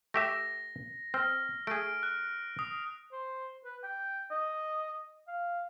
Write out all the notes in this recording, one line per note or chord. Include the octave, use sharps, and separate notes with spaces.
A3 G4 E5 A#6
C4 F6
A3 G#4 D7
F#6
D#6
C5
B4
G5
D#5
F5